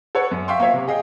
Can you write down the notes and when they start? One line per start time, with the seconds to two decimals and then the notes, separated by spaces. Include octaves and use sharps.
0.15 A4 B4 C#5 F#5
0.31 F#2
0.48 E5 F5 G5 C6 C#6
0.60 A#3 F4 C#5 E5
0.74 C3
0.87 G#4 D#5 F5 G5